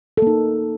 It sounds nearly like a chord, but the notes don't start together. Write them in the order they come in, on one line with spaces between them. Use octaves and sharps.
A4 A#3 D#4